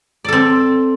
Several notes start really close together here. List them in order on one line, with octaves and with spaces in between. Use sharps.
D5 A4 C4